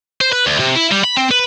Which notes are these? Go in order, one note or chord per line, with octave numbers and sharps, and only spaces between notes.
C5
B4
D2
C3
E4
G3
B5
C4
B4